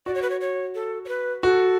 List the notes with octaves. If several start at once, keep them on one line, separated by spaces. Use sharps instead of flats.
F#4 D5
C#5
B4
C#5
C#5
A4
C#5
B4
F#4 A4